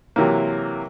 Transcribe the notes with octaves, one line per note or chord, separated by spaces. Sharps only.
C3 E3 F#3 A#3